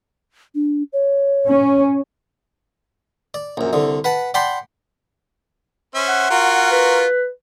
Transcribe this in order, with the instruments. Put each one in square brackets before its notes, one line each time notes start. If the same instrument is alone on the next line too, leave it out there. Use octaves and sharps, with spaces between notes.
[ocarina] D4
C#5
[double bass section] C#4
[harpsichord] D5
A#1 F#2
C2 D3
B4 F#5 A5
D5 F#5 G5 A5 B5 C6
[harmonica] C#4 C5 E5
[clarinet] F#5
[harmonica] F4 F#4 A#4
[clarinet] B4